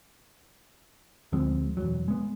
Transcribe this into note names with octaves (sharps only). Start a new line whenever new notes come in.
D2 F3 G#3 C4
E1 C2 F#3
G#3 B3